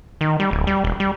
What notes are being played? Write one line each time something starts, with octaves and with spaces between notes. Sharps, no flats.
D#3
G3
D1
G3
E1
G3